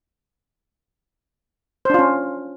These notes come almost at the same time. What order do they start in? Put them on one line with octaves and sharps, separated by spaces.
C5 D4 F4 C#4